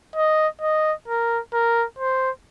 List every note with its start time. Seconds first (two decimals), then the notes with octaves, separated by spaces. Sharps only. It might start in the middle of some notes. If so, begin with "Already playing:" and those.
0.16 D#5
0.61 D#5
1.08 A#4
1.53 A#4
1.99 C5